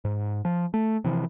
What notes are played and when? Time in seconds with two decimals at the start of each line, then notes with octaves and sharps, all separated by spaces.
0.05 G#2
0.45 F3
0.74 A3
1.04 C3 E3 F3